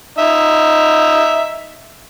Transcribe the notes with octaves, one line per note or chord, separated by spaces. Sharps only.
D#4 E5